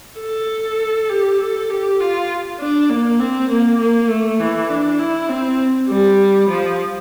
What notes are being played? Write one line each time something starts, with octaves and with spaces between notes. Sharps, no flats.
A4
G4
A4
G4
F4
D4
A#3
C4
A#3
A#3
A3
E3
D4
E4
C4
G3
F3